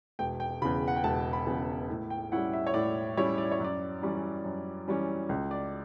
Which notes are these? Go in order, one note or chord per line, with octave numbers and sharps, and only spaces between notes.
E1 G5
G5
E2 C#3 B5
F#5
G5
E1 A5
B5
E2 C#3
A2
G5
G3 C#4 E4 F#5
E5
C#5
A2 D5
G3 C#4 E4 C#5
D5
C#5
F#2 D5
E3 G3 C#4
F#2
E3 G3 C#4
C#2
D5